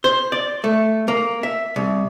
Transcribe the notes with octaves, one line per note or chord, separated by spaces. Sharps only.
C5
D5
A3
A#3
E5
C2